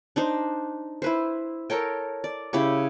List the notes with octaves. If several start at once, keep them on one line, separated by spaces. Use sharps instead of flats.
D4 D#4 C5
E4 B4 C5
A4 A#4 C#5 G5
D5
C#3 E4 G4 C#5